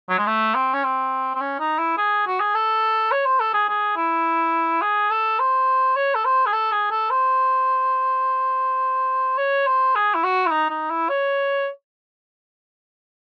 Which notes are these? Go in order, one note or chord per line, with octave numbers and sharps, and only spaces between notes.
F#3
G#3
A3
C4
C#4
C4
C4
C#4
D#4
E4
G#4
F#4
G#4
A4
C#5
C5
A4
G#4
G#4
E4
G#4
A4
C5
C#5
A4
C5
G#4
A4
G#4
A4
C5
C#5
C5
G#4
E4
F#4
E4
D#4
D#4
E4
C#5